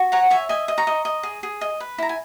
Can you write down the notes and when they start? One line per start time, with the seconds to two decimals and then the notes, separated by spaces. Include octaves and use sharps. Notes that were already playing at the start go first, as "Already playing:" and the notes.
Already playing: F#4
0.12 C#5 F#5 A#5
0.30 C#5 E5 G#5
0.49 D#5 E5 G#5
0.68 D#5
0.78 A#5 C#6
0.87 D#5
1.05 D#5
1.23 G#4
1.43 G#4
1.61 D#5
1.80 B4
1.98 E4 A#5
2.09 G#5